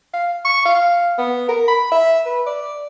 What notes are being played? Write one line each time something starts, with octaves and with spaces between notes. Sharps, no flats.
F5
C#6
F5
B3
A#4
B5
E5
B4
D5